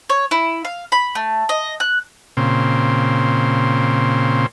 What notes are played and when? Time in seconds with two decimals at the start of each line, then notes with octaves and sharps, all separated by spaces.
0.10 C#5
0.31 E4
0.65 F5
0.92 B5
1.15 A3
1.49 D#5
1.80 F#6
2.37 A#2 C#3 C4